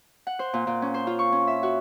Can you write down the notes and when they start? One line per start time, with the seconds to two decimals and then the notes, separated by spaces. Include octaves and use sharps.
0.27 F#5
0.39 C5
0.54 A#2
0.67 A#2
0.82 C#4
0.94 C5
1.07 F4
1.19 C#6
1.32 C#4
1.47 E5
1.63 F#4